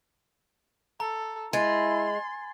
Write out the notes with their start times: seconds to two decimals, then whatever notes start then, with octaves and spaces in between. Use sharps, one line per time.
1.00 A4 A#5
1.53 G#3 E4 G#5 C6 G#6 A6